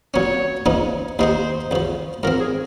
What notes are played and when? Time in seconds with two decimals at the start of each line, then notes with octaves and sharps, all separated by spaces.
0.14 A#2 F#3 C#4 C#5
0.66 C#2 C#3 F3 A#3 D#4
1.19 D#2 D#3 A#3 D#4 G#4 C5
1.71 C#2 C#3 F3
2.23 G#2 F3 C4 A#4
2.40 G#4